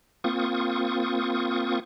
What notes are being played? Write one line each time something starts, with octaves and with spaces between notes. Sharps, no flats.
A#3 C4 F4 C#6 D#6